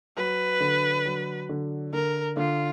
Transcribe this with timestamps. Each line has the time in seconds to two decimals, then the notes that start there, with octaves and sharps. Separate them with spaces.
0.17 F#3 B4
0.60 D3
1.06 F#3
1.49 D3
1.93 D3 A#4
2.37 D3 F4